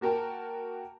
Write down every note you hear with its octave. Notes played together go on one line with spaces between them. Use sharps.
A#3 F#4 A#4 G5 A5